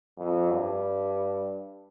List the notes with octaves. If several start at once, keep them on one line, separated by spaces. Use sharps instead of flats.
F2
G2